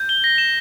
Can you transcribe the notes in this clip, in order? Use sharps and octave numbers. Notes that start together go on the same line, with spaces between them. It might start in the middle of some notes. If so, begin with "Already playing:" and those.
Already playing: G6
G7
A#6
E7